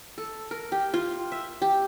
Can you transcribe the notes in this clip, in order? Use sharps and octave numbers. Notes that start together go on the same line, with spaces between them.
A4
A#4
G4
F4
E5
G4